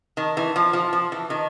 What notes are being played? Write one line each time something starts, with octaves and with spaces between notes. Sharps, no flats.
D#3
E3
F3
F3
F3
E3
D#3